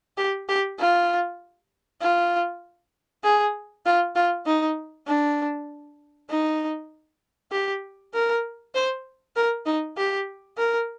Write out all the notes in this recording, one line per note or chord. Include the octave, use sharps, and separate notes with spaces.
G4
G4
F4
F4
G#4
F4
F4
D#4
D4
D#4
G4
A#4
C5
A#4
D#4
G4
A#4